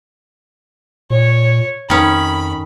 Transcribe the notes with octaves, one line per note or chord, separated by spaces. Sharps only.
A#2 C#5
F2 D#3 C#4 B5